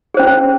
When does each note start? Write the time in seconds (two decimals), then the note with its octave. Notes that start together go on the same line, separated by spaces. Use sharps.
0.14 G#4
0.17 C5
0.20 C#4